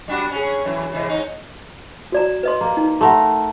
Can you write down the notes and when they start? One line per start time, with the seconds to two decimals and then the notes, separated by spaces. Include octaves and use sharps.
0.08 G3 D4 F#4
0.31 C#4 G#4
0.65 F#2 E3
0.93 C3 E3 G#3
1.09 G#2 C#4 D#4
2.12 F#4 D5 A#5
2.43 B4 D#5 C6
2.61 A#3
2.77 D#4
3.01 A3 A#4 F#5 B5 C6